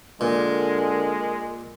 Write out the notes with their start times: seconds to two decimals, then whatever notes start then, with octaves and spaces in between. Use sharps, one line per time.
0.21 A#2 D3 G#3 A#4